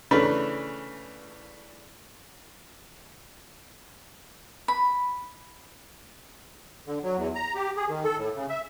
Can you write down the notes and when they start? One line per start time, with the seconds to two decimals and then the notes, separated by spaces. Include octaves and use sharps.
0.11 C#3 E3 A3 D4 B4
4.68 B5
6.87 D3
7.04 F#3
7.17 E2
7.35 A#5
7.55 G4
7.77 G#4
7.89 D#3
8.04 A4
8.17 A2
8.35 C#3
8.49 E5